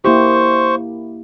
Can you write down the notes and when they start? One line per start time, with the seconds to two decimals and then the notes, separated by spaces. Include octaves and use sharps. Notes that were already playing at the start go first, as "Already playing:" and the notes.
0.05 A#3 E4 G4 C5 C#6